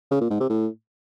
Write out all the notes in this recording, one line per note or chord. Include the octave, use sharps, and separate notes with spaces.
C#3
A#2
G#2
C3
A2